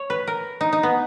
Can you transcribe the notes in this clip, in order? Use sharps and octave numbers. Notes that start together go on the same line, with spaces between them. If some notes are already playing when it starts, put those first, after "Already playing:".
Already playing: C#5
B4
A#4
D#4
D#4
B3